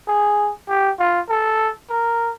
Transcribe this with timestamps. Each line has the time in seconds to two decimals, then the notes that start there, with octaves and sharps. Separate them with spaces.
0.08 G#4
0.69 G4
0.99 F4
1.29 A4
1.90 A#4